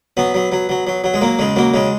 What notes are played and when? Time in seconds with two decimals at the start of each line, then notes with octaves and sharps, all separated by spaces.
0.17 F#3 B3
0.34 F#3
0.52 F#3
0.69 F#3
0.87 F#3
1.04 F#3
1.14 G#3
1.21 F#3 A#3
1.39 C#3 G#3
1.56 F#3 A#3
1.74 C#3 G#3